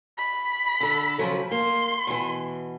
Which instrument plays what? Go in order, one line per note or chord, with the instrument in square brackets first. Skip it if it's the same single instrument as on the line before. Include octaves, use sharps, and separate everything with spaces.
[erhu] B5
[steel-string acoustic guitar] D3 A4
C#3 F3 F#3
[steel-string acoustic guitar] A#3 [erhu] C6
[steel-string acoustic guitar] B2 E3